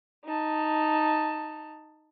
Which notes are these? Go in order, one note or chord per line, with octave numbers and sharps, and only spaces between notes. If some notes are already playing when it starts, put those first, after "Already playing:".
D#4 A5